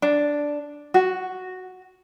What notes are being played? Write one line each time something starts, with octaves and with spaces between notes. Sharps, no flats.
D4
F#4